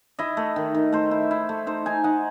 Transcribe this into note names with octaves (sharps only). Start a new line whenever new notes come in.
E4 D#5
A3
D#3
D#3
A3 C5
E4
E4
A3
D#4 C5
D#4 G#5
D#4 F#5